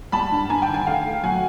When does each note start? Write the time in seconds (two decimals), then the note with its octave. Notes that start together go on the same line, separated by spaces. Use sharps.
0.12 G3 A5 B5
0.32 G2
0.49 G2 G#5 A#5
0.62 G5 A5
0.68 D#3
0.74 F#5 G#5
0.87 A3 F5 G5
1.05 A3
1.24 F#3 F#5 G#5